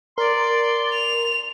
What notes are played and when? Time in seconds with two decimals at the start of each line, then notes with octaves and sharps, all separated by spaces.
0.18 A#4 D5 C6
0.94 F7